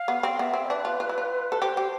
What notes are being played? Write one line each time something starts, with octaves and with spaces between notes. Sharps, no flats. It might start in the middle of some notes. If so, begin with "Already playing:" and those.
Already playing: F5
B3
C4
B3 E5
C4
D4 B4
F4
F4
E4
F4
A4
G4 C5
G4